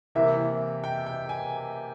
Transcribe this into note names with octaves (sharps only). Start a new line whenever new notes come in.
C3 E3 A#3 E4 E5
G5
G5
G#5